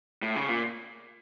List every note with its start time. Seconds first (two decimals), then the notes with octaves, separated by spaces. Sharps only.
0.22 A2
0.36 C#3
0.49 A#2